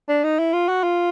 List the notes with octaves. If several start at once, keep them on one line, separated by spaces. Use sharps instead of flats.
D4
D#4
E4
F4
F#4
F4